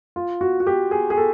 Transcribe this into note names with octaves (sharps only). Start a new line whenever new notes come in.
F4
F#4
F#4
G4
G#4
G#4
A4